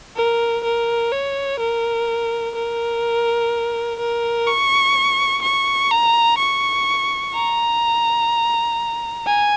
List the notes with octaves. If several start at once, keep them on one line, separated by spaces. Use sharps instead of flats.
A#4
A#4
C#5
A#4
A#4
A#4
C#6
C#6
A#5
C#6
A#5
G#5